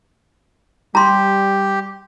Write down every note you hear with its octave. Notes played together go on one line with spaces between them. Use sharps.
G3 G4 A#5 C6